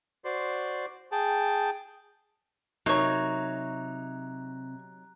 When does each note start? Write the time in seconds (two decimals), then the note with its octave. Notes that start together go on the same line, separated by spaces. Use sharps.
0.25 F#4 C5 D5 C6
1.12 G#4 G5 A5
2.86 C3 F#3 A#3 D#4 C#5 A#5 F#6